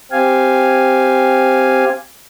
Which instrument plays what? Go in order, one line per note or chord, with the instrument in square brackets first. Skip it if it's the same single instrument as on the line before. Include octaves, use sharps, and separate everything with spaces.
[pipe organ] C4 G4 F5 G#5